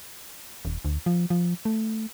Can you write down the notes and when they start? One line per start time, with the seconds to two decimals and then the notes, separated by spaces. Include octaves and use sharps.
0.65 D#1
0.85 D2
1.06 F3
1.30 F3
1.65 A3